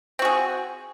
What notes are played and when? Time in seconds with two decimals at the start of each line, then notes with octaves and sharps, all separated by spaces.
0.19 C4
0.22 F#4
0.25 G#4